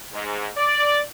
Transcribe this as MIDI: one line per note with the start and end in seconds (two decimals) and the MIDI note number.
0.12 0.47 44
0.56 1.00 74